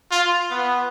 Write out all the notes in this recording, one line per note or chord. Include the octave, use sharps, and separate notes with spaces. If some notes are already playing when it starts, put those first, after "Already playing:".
F4
B3